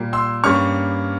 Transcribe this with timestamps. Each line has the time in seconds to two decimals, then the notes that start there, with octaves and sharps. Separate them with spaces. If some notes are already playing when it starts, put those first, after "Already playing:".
Already playing: A#2 G3 A#3
0.13 C6 E6
0.44 G2 G3 A#3 C#4 C#6 F6